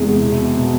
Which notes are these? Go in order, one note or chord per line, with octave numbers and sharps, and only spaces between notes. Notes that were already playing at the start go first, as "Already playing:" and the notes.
Already playing: E2 C3 G#3
B2
B2